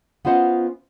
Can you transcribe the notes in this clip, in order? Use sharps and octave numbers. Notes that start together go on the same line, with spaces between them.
B3 C#4 F4 C5 D#5 F#5